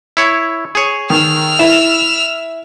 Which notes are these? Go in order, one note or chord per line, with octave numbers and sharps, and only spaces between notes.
E4 C#5
G#4 C#5
D#3 E6 F6
E4 E7